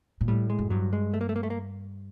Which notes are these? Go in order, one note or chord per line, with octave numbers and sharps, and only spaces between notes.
A#2
A2 G3
G#3
F#2
G2 F#3
G#3
A3
A#3
A3
A#3
A3
A#3